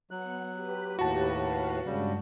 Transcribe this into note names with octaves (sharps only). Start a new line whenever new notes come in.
F#3 B3 F#5 F#6
G4 B4
D#2 A2 F#4 A5
B4 F5 F#5
G2 C#3 G3 G#3